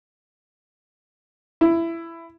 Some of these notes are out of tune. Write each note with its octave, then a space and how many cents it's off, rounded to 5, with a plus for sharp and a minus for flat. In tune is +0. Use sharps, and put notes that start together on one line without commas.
E4 +15